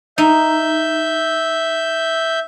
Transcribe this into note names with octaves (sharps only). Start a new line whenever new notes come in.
D#4 E5 G6